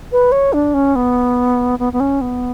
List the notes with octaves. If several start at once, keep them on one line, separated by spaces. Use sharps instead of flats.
B4
C#5
D4
C#4
B3
B3
B3
C#4
B3